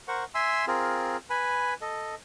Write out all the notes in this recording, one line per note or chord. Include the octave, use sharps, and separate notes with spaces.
A#4 C5 F#5 C#6
E5 G#5 C6 E6
C4 F4 G#4 A#4
B4 G#5 B5
A4 D#5